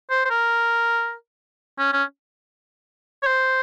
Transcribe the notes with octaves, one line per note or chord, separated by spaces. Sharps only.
C5
C5
A#4
C#4
C#4
C#5
C5